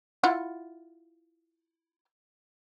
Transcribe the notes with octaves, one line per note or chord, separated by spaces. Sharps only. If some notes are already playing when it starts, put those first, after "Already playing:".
E4 F4 F#5